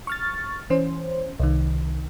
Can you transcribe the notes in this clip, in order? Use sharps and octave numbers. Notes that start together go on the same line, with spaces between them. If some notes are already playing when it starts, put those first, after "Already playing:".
C#6 F6 A6
E3 C#4 C5
C2 D#3